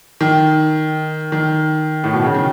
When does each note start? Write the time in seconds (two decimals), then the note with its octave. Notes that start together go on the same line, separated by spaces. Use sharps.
0.21 D#3
1.32 D#3
2.04 A2
2.13 B2
2.24 C#3
2.34 D#3